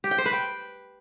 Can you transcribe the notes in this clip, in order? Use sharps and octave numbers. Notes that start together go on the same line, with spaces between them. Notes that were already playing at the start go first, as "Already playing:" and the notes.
G4
G5
C5
B4
G5